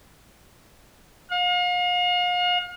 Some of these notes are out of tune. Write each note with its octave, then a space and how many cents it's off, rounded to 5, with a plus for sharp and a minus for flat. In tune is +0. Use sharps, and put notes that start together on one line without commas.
F5 +40